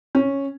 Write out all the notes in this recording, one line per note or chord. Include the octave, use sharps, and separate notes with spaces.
C#4